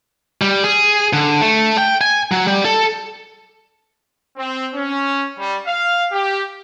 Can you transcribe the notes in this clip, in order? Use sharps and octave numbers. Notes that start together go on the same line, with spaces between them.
G3
G#4
D3
A3
G5
G#5
F#3
G3
A4
C4
C#4
G3
F5
G4